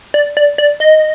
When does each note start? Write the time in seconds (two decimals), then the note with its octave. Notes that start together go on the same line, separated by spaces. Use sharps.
0.14 D5
0.37 D5
0.58 D5
0.80 D#5